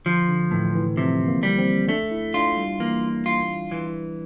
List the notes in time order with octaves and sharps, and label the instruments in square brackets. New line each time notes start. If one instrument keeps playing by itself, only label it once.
[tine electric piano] D3 [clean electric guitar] F3
[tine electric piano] D3
[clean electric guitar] A2 [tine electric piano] E3
[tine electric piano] E3
[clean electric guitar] C3 [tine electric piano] F3
[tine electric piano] A#3
[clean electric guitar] G3
[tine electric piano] C4
[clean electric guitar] A3 [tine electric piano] D4
[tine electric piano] E4
[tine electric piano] D4 [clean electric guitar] F4
[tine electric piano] G3
[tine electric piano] E3 [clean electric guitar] A#3
[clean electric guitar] F4
E3